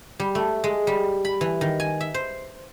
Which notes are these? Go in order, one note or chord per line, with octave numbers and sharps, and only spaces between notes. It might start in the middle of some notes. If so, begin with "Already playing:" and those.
G3
A3
G#3
G3
B5
E3
D#3
G#5
E5
C5